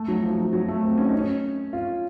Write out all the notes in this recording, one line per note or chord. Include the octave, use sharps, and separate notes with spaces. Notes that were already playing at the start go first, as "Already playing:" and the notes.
Already playing: A3
F#3
F3
F#3
F#3
A3
C4
C#4
D#4
C#4
F4